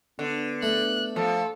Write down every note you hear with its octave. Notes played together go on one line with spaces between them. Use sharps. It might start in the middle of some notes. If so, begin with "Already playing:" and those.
D3 B3
A3 F#6
F3 A4